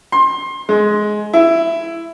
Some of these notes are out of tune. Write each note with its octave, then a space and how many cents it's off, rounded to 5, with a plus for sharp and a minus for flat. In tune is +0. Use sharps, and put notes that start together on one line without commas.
C6 +25
G#3 +15
E4 +10